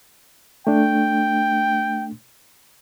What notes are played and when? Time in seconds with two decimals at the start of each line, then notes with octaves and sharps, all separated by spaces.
0.67 A3 D4 G5